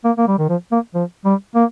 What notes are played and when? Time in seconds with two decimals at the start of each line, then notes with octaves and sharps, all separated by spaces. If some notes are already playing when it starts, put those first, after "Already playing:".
0.05 A#3
0.18 A#3
0.28 G3
0.39 D#3
0.49 F3
0.72 A#3
0.95 F3
1.25 G3
1.55 A#3